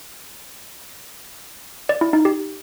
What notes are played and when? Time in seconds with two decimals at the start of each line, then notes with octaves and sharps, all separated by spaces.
1.89 D5
2.01 E4
2.13 D#4
2.25 G4